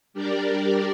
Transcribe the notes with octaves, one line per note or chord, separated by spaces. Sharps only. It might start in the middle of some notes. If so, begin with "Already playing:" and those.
G3 D4 G4 A#4 D5